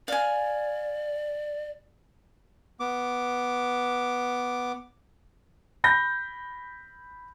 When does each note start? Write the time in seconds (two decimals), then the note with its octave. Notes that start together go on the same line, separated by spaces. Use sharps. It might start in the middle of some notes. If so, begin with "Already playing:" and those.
0.08 D5 F5 G#5
2.80 B3 D6
5.84 B5 G6 A#6